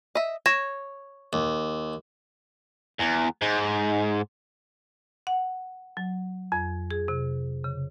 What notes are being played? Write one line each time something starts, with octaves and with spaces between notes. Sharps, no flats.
D#5 E5
C#5 G#6 A#6 E7
D#2
E2
G#2
F#5
F#3
F2
G#4
C3
C#3